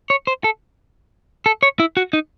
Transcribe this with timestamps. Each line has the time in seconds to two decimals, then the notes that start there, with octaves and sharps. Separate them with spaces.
0.10 C#5
0.27 C5
0.44 A4
1.46 A4
1.63 C#5
1.80 E4
1.97 F#4
2.13 D#4